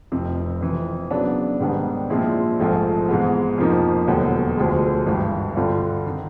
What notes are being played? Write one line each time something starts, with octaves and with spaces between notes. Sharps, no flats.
F1 F2 C3
F2 C3 E3
C#3 F#3 B3 D4
G#2 D#3 G3 B3 D4
A#2 F3 G#3 C4 E4
A#1 G#2 F3 A3 C4
G#2 E3 G#3 B3
F2 C3 F3 A#3 D#4
E1 D#2 D3 F#3 B3
D2 D3 F3 G#3
G#1 G2 E3
G2 D3 G3 C4 F4
D#3